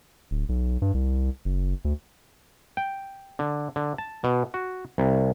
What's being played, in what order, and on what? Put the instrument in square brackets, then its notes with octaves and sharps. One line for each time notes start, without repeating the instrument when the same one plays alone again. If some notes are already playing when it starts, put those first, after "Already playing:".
[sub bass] D1
B1
G2
C2
F#1
D2
[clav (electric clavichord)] G5
D3
D3
A5
B2
F#4
C2